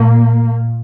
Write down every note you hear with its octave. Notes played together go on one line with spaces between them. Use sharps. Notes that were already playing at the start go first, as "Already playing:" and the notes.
Already playing: A#2 A#3